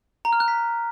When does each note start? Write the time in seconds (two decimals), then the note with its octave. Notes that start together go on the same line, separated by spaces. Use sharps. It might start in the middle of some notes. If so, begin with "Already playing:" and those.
0.25 A#5
0.33 F6
0.40 F#6
0.48 B6